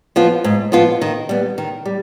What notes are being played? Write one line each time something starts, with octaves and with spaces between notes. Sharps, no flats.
F3 B3 F4
G#2
F3 B3 F4
D#3
G3 B3
D#3
G3